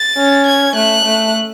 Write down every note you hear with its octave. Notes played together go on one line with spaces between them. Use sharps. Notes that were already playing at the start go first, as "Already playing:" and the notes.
Already playing: A6
C#4
G#6
A3 F#6
A3